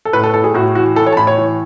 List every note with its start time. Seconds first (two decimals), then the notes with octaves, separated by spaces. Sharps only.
0.05 A4
0.13 A2 B4
0.24 A4
0.34 A2 A4
0.44 G#4
0.54 A2 F#4
0.75 E3 F#4
0.96 E3 A4
1.06 C#5
1.13 A5
1.17 A2 B5
1.27 C#5
1.38 E3